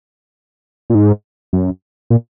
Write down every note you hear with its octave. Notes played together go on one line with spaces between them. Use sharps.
A#2
G#2
F#2
A#2